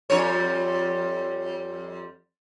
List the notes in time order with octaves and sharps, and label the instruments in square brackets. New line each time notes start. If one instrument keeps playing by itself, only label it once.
[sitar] F2 G3 C#5